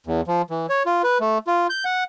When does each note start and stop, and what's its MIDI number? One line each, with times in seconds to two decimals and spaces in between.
0.06 0.21 40
0.27 0.42 53
0.50 0.66 52
0.69 0.83 73
0.86 1.02 65
1.04 1.18 71
1.20 1.38 57
1.47 1.67 65
1.70 1.84 91
1.85 2.04 78